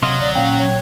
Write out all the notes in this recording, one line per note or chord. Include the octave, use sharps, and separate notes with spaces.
C3 F#3 D#5 F5 C6
D2 D5
A#2 C#4 F5 G5
C#5